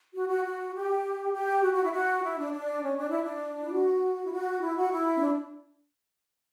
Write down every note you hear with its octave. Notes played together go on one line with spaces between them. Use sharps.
F#4
F#4
F#4
G4
G4
F#4
F#4
E4
F#4
E4
D4
D4
C#4
D4
E4
D4
E4
F#4
E4
F#4
E4
F#4
E4
C#4
D4